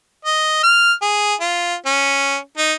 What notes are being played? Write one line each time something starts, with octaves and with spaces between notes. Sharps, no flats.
D#5
F6
G#4
F4
C#4
D#4